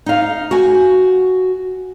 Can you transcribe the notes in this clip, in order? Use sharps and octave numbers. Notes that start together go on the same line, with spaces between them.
D#4 F5
F#4 G#5